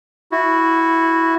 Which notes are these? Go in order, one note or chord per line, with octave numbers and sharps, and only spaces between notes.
E4 F#4